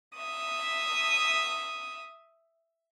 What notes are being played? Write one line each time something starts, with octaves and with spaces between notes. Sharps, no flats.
E5 D#6